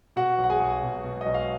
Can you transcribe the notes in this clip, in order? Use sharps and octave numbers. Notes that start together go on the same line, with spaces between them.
B2 F#4 F#5
B1
F#5
G#4 G#5
B1
B2
B2
D#5
B1
F5